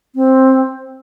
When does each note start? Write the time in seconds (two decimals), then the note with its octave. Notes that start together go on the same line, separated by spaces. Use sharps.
0.15 C4